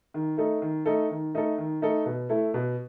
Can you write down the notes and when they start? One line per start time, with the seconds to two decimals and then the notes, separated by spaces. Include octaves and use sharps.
0.14 D#3
0.37 A3 D#4 A4
0.62 D#3
0.86 A3 D#4 A4
1.10 D#3
1.34 A3 D#4 A4
1.58 D#3
1.82 A3 D#4 A4
2.06 B2
2.29 A3 E4 A4
2.54 B2